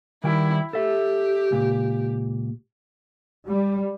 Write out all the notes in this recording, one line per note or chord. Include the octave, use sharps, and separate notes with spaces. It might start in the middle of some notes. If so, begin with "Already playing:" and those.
D#3 G3 E4 G5
G4 A4 E5
C#2 A#2
G3